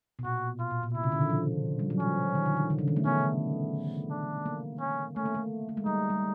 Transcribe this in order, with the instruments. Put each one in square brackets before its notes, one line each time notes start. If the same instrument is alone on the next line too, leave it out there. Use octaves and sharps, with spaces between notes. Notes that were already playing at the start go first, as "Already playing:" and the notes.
[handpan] B2
[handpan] A#2 [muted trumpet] F#4
[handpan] B2 [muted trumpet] F4
[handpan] A#2
A#2
[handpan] C3 [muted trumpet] E4
[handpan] C#3
D3
D#3
F3
G3
F#3
[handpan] F3 [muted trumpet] C#4
[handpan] D#3
D3
D#3
D3
C#3
D#3
A3
[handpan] B3 [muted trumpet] C#4
[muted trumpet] D4
[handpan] A#3
[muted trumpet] C#4
[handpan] A3 [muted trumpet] C#4
[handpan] A#3
A3
A3
G#3
[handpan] G3 [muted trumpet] D#4
[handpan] G3